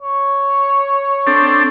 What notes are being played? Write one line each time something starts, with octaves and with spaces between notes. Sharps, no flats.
C#5
C4 D4 A4